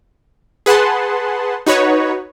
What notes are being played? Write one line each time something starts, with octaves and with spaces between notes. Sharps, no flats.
G#4 B4 F#5 A5 C6
D#4 F#4 B4 C#5